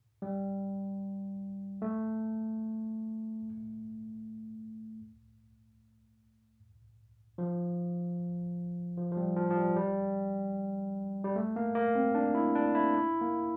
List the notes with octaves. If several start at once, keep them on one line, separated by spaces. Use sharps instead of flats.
G3
A3
F3
F3
F3
G3
F3
F3
G3
G3
G3
A3
A#3
A#3
C4
D4
E4
D4
E4
E4
A#3